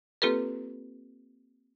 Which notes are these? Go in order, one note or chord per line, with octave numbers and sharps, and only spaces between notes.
A#3 C4 F4 G4 A4 B4